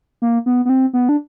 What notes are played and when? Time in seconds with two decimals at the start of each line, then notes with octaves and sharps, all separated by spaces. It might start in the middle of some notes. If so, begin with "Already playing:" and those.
0.22 A#3
0.46 B3
0.65 B3
0.69 C4
0.93 B3
1.09 D4